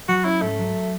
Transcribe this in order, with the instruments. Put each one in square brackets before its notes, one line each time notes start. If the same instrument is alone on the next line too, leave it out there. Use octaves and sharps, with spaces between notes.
[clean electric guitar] F#3 [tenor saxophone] F#4
[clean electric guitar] C#4 [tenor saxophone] E4
[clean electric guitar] G#2 [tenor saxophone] A3
[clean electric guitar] F#3